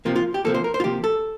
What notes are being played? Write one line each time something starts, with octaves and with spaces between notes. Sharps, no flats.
C3 F3 A#3 F4
F4
G4
C3 F3 A#3 A4
C5
A#4
C5
F4
C3 F3 A#3 G4
A4